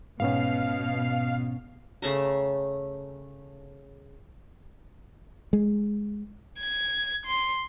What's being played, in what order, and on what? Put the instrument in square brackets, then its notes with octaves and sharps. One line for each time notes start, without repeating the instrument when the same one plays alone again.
[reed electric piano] G#2 B3 C#4 [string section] B2 [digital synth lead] F5
[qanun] C#3 A3 A#5
[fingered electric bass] G#3
[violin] G#6
C6